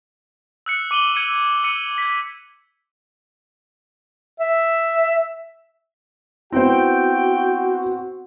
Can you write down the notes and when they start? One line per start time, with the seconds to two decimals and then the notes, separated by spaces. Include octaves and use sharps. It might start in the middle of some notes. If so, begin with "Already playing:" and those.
0.66 E6 F#6 C#7
0.91 D6 D#7 F#7 G7
1.15 E6 G#6 C#7 D#7
1.64 E6 C#7 D#7
1.98 G#6 B6
4.40 E5
6.52 B3 C4 E4 F#4 C5 G5